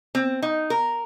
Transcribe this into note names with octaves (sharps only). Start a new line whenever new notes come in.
C4
D#4
A#4